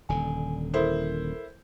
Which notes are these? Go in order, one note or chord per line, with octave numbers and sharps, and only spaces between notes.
D#1 D3 G#5
E4 A4 A#4 C5